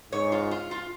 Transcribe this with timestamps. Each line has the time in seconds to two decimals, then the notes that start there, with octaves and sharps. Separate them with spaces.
0.12 G#2 C#5
0.32 F4
0.51 F4
0.71 F4